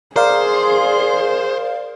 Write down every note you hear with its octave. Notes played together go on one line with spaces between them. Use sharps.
G#4 A#4 C5 D5 F5